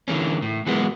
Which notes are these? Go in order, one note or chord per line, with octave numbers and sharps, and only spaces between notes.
D3 E3 G3 A#3 C#4
A2
E3 F#3 G#3 A#3 B3 F#4